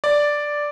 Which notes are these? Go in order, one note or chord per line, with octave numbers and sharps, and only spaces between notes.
D5